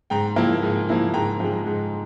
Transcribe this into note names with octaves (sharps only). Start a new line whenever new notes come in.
G#2 G5 A#5
F3 A#3 E4
G#2
F3 A#3 E4
G#2 G5 A#5
F3 G#3
G#2